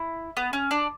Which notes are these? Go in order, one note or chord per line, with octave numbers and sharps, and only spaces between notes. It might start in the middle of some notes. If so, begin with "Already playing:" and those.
Already playing: E4
B3
C#4
D4